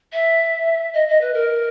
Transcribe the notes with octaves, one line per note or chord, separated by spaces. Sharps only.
E5
D#5
D#5
B4
A#4